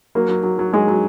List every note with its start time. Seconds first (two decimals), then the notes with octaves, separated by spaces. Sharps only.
0.15 F#3 A#3
0.29 F#3
0.43 F#3
0.59 F#3
0.73 F#3 G#3
0.88 F#3